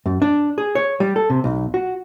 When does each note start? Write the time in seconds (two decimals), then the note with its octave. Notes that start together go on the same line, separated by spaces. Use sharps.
0.06 F#2
0.22 D4
0.58 G#4
0.75 C#5
1.00 G3
1.16 A4
1.30 C3
1.44 B1
1.74 F#4